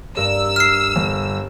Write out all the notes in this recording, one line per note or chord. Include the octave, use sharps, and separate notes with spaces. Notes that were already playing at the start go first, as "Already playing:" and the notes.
G2 A#4 E6
F6 C7
G1